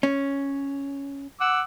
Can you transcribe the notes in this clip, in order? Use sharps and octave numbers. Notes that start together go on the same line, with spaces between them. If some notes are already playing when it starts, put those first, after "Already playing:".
C#4
F#5 D6 E6